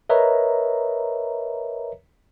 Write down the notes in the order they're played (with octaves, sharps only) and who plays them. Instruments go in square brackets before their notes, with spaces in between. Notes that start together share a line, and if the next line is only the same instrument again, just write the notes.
[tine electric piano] A#4 B4 C#5 D#5 E5 A#5